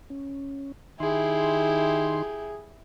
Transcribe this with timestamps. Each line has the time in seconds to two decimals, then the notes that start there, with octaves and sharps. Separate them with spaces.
0.10 C#4
1.00 D#3 D#4 E4 G4 G#4 C6